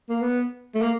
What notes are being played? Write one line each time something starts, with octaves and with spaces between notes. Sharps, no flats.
A#3
B3
A3
A#3